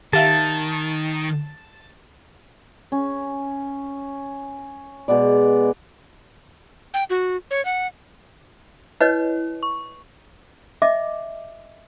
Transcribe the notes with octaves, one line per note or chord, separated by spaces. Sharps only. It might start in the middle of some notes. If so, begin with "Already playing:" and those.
D#3 G4 E5 F5 A5
C#4
B2 G#3 B3 D5
G5
F#4
C#5
F#5
E4 B4 C#5 D#5
C#6
D#5 E5 D6